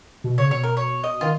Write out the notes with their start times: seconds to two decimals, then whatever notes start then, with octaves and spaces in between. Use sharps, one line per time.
0.24 B2
0.38 C#3 C#5
0.51 B2 C#5
0.64 A#4
0.77 C#5
1.04 D#5
1.21 D#3 F4